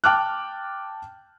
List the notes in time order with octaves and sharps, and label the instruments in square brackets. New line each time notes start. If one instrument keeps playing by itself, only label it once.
[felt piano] G5 A5 D6 F6 F#6